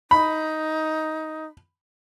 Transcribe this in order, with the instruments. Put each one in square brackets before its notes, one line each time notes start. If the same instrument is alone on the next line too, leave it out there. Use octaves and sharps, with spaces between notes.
[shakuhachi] D#4 [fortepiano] B5